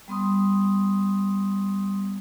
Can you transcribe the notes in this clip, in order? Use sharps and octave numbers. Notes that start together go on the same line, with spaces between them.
G3 B3 C6 D#6